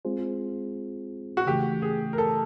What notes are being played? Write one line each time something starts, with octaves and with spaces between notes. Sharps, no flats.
G#3 C4 F4 G#4 C5
F#4
C#3 E3 A3 G4
G#4
A#4
A4